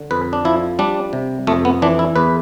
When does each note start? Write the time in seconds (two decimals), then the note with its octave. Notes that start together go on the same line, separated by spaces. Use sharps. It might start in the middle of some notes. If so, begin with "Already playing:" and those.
Already playing: D3
0.11 F2 B4
0.33 D4
0.45 F3 E4
0.79 G3 D4
1.13 C3
1.47 F2 A3
1.65 B3
1.82 E3 D4
1.99 E4
2.16 E2 B4